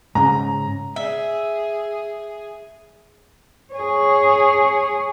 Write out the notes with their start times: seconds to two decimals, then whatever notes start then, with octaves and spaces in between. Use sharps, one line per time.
0.15 G#2 C#3 A#5
0.96 G#4 E5
3.73 G#4 C#5